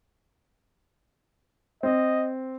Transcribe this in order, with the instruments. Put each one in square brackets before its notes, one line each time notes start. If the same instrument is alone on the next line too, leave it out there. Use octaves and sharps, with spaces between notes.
[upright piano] C4 [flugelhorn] D#5